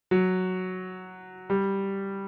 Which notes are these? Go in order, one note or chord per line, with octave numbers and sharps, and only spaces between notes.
F#3
G3